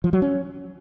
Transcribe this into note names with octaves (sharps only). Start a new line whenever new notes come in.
F3
F#3
C#4